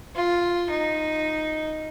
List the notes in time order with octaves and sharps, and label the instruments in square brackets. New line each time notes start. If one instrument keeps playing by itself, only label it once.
[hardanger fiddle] F4
D#4